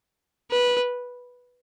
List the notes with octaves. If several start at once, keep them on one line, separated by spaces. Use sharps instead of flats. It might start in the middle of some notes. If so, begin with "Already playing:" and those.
B4